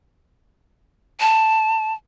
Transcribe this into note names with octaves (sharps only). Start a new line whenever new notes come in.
A5